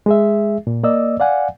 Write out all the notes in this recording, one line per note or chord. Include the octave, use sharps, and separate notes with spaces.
G#3 G#4 E5
A#2
A#3 D5 D#5 E6
D5 F5 F#5 G#5